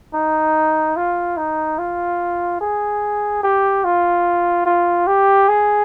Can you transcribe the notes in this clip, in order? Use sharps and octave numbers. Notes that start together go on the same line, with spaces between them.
D#4
F4
D#4
F4
G#4
G4
F4
F4
G4
G#4